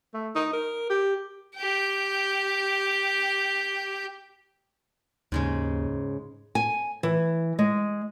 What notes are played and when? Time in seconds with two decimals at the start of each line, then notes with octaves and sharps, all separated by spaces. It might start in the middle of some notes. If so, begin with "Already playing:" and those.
0.14 A3
0.35 D#4
0.53 A#4
0.90 G4
1.56 G4 G5
5.32 D#2 G#2 C#3 G#3
6.55 G#5
7.03 E3
7.59 G#3